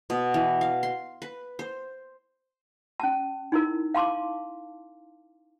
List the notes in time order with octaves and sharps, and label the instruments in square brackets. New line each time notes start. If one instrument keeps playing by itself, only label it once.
[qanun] B2
E3
F5
C6
B4
C5
[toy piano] C#4 A5
D#4 E4 A#4
F5 A5 C6 D6